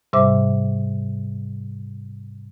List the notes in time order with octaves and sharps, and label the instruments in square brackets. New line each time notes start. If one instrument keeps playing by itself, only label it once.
[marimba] G#2 C3 G3 C5 E5 D6